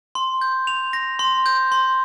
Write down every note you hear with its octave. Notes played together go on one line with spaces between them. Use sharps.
C6
G6
F7
A#6
C6
G6
C6